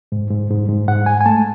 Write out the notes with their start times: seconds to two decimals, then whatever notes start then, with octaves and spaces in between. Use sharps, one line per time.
0.12 G#2
0.31 G#2
0.51 G#2
0.68 G#2
0.88 G#2 F#5
1.06 G#2 G#5
1.21 G#5
1.26 A3 A5